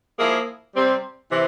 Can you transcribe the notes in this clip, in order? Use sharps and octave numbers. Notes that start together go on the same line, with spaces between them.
F3 A#3 E4 G#4
C3 G3 C4
C3 E3